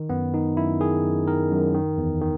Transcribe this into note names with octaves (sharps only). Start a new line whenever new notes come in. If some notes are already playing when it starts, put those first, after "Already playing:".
Already playing: D#3
F#2 B3
D#3 D#4
F#2 E4
D#3 G#4
F#2
D#3 A#4
F#2
D#3
E2
D#3